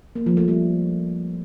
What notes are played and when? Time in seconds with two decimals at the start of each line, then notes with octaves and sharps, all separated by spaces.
0.15 A#3
0.26 F3
0.37 A3
0.48 G3